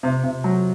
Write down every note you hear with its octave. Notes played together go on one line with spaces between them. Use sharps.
C3
C3
F#3